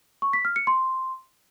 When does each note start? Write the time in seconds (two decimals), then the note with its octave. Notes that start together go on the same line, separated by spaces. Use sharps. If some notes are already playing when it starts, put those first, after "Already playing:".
0.22 C#6
0.33 B6
0.45 F6
0.56 C#7
0.67 C6